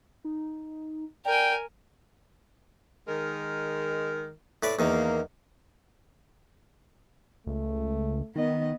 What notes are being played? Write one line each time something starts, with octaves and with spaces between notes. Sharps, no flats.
D#4
A#4 D5 G5 G#5
D#3 G#3 A#4
A2 B4 D5
E2 D#3 A#3
C#2 A3
D#3 B3 D#5